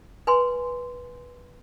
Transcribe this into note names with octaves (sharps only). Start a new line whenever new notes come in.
B4 G#5 C6